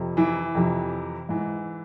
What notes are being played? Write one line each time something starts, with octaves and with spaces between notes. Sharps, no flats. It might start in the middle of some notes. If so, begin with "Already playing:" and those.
Already playing: F2 C3
E3 E4
F2 C3 E3
G#2 E3